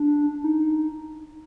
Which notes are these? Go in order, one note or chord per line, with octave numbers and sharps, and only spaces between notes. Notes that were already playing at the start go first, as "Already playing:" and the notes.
Already playing: D4
D#4